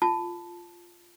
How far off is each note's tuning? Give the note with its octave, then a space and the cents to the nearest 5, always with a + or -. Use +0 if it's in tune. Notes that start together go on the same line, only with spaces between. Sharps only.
F4 +0 A5 +0